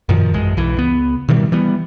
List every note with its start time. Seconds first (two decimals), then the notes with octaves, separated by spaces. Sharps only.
0.09 F#2 A#2 D#3 F3
0.34 A1 F#2 G#3
0.57 B1 E3
0.77 C#2 B3
1.29 B2 D#3 E3 G3
1.52 E3 G3 B3